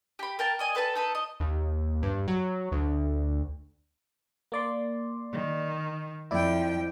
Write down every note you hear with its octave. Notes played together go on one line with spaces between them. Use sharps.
G4 B5
A#4 G5 A5
D5 D#5 G#5
A4 B4 G5 A5
D#4 A4 B4
D#5
D#2
G2
F#3
D2
A#3 D5 C6
D#3
F2 E4 D5 G5